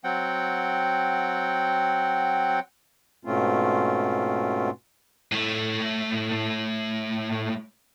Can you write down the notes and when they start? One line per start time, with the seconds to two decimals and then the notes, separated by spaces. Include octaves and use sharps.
0.04 F#3 C4 F#5 G5
3.25 G#2 B2 A3 C4 C#4 F4
5.32 A2 A3